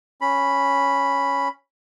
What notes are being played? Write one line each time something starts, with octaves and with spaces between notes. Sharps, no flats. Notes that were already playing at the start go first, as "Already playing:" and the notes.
C#4 B5